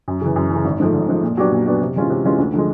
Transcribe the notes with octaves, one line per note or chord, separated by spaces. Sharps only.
F#2
C#3 E3
F#2
E3
C#3
G#1
G#2 F3 A3
G#1
G#2 F3 A3
A#2
F#3 B3 D4 G4
A#2
F#3 B3 D4 G4
C3
E3 G#3 C#4 F4
C3
E3 G#3 C#4 F4
D2
D3 F3 G#3